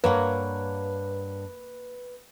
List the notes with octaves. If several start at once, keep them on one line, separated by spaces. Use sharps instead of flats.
G2 A#3 B4 C#5 F#5